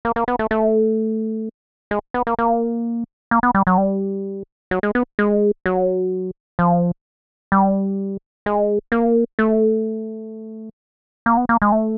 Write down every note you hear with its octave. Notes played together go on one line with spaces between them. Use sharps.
A#3
A#3
B3
A3
A3
G#3
B3
A#3
A#3
A#3
B3
G3
F#3
G3
F#3
G#3
B3
G#3
F#3
F3
G3
G#3
A#3
A3
A#3
B3
A#3
G#3
A3